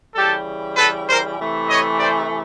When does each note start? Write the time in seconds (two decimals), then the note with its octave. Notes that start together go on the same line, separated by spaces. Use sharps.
0.15 C#3 E3 G3 G4 A4
0.76 A4 B4
1.07 A#4 C5
1.37 C3 E3 A3
1.69 C#5 D#5
1.99 C5 D5